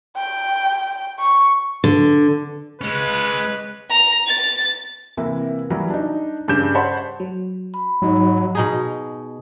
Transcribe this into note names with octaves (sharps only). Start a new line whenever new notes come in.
G5
C#6
D3
G#3 C#4 B4
A#5
A6
C3 E3 A#3 E4
E3 F#3 G3
D4 D#4
G2 C#3 C#4 G4 G6 E7
C5 C#5 F#5 A5 B5 C6
F#3
B5
G#2 F#3 D#4
B2 D#4 G#4